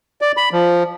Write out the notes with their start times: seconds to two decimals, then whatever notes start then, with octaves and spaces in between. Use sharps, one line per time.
0.21 D5
0.37 B5
0.53 F3